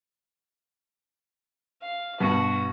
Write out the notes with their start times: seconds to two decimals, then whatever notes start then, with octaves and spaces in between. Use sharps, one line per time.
1.82 F5
2.20 G2 B2 F#4